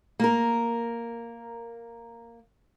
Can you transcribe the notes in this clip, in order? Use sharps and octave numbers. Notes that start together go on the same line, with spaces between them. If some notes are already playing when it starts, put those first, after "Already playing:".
A#3 A#4